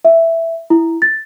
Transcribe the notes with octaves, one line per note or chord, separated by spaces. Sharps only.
E5
E4
A6